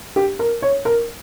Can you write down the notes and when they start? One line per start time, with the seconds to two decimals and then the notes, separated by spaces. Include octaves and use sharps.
0.16 G4
0.39 A#4
0.62 C#5
0.85 A#4